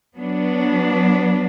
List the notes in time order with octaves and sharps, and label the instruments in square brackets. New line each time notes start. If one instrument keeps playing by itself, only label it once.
[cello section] F#3 B3 D4